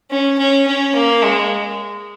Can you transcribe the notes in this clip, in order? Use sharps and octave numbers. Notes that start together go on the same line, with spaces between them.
C#4
C#4
C#4
A#3
G#3